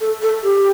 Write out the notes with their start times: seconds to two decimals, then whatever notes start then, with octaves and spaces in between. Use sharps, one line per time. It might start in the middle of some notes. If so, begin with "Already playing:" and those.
0.01 A4
0.22 A4
0.43 G4